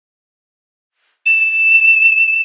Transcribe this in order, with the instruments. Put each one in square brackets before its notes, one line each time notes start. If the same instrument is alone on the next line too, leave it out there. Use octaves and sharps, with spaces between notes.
[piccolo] E7